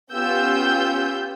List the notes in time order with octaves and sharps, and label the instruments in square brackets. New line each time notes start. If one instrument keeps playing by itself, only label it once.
[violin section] B3 C#4 F4 G4 E6 G6